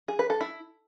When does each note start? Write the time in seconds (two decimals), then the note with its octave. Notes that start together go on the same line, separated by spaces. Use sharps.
0.08 G#4
0.19 B4
0.30 A4
0.41 E4